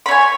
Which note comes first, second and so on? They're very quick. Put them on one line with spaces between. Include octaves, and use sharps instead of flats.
B5 C#5 G#5